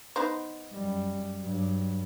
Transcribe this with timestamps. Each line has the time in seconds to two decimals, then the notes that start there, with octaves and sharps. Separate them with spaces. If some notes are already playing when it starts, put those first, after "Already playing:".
0.16 B3 D#4 C5
0.73 F#2 G3
1.42 G2 F#3